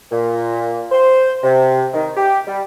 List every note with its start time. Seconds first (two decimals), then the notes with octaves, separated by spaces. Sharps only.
0.11 A#2
0.91 C5
1.43 C3
1.93 D#3
2.17 G4
2.47 G3